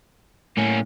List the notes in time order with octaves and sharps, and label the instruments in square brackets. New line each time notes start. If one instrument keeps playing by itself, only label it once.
[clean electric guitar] A2 [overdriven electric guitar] A#3 C#4